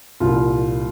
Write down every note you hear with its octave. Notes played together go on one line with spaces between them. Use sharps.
C2 A#2 F3 F4